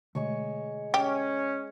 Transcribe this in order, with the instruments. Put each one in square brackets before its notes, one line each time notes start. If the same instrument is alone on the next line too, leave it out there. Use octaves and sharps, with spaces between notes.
[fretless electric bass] B2 D3 A3 [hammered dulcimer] G#3 C#5 C#6
[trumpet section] C#4 [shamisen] G4